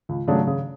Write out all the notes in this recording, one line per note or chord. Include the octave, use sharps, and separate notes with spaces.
C#2
C#3 F#3 A3 D4
C#3